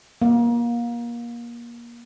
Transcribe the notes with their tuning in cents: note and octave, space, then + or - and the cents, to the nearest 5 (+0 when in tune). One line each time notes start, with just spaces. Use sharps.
A#3 +25